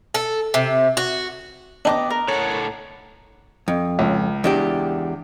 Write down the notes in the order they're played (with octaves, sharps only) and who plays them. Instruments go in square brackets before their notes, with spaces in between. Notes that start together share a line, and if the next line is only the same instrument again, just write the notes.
[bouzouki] A4
C3
F#4
[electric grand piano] B3 [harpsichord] D4 D#4 [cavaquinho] G4 D#5 D6
[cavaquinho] A#4
[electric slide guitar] A2 A4 F#5 [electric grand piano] C#5
[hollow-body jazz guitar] F2
[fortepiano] C#2
[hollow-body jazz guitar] E2 D4 G4